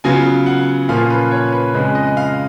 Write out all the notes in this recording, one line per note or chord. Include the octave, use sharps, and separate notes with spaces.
C#3 F#3 B3 F4 G#5
F#5
A#2 F3 A#3 C#4 F4 F5
B4
C#5
B4
F2 C#3 G#3 B4
D#5
F5